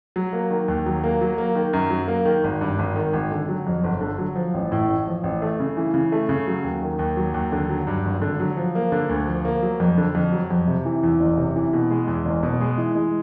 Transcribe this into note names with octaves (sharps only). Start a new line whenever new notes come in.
F#3
A#3
D#3
D#2
F#3
A#3
F#3
A#3
D#3
F#2
F#3
A#3
D#3
G#1
G2
G#1
D#3
G#1
D3
F#3
F2
G1
D3
F#3
F3
A1
A2
A1
F3
A1
A3
C#3
E3
C#3
A3
C#3
F#3
D#2
D#3
D#2
F#3
D#2
D3
F#3
G2
G#1
D3
F#3
F3
A#3
D3
D2
F3
A#3
F#3
F2
D3
F2
F#3
F2
C3
E3
E2
F#1
C3
E3
B2
G#3
E2
F#1
B2
G#3
E3
G#3